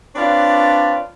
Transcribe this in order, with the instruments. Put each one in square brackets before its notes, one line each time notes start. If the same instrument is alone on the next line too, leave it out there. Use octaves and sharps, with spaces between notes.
[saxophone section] C4 D4 F4 B4 C#5 D5